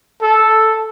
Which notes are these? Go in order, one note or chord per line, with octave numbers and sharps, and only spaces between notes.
A4